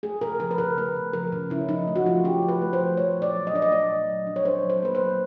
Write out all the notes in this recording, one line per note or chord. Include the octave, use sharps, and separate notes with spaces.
A3 G#4
C#3 A#4
F3 A#4
B4
C#3 A#4
A3 B4
C#3
F3 A#4
C#3
C#4 E4
F3 D#4
A3
F#4
F3 F4
C#4 G4
F3
B4
A3
C5
F3
A3 C#5
A#2
D5
F#3
D#5
D4 D5
D#5
A3 D5
A#2
F#3
D4
C#5
D4 C5
F#3
C5
A#3 B4
C5
F#3